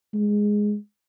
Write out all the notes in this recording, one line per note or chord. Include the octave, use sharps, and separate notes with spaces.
G#3